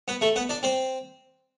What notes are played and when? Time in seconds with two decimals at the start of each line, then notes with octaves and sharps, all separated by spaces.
0.08 B3 B4
0.21 A3 A4
0.36 B3 B4
0.49 D4 D5
0.63 C4 C5